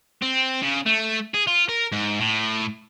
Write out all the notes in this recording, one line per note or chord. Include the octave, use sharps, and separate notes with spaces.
C4
C#3
A3
G#4
F4
A#4
G#2
A2